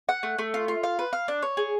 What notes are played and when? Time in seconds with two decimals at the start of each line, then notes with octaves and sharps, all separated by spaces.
0.09 F#5
0.23 A3
0.38 A3
0.54 F4
0.68 F4
0.83 F5
0.99 B4
1.13 F5
1.28 D4
1.43 C#5
1.57 G#4